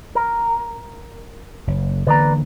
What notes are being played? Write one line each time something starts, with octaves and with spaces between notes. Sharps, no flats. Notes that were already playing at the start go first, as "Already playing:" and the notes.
A#4
F#1
D3 E3 A#3 B4 D5 A#5